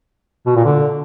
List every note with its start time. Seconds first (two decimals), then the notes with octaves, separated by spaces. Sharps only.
0.46 B2
0.56 A#2
0.65 D3